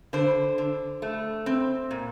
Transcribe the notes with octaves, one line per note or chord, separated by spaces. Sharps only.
D3 C5
D3
A3
C4
A#2